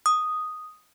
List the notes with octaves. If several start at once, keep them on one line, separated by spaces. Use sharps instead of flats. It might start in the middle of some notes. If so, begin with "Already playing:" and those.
D#6